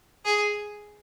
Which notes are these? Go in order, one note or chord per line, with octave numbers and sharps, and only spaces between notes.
G#4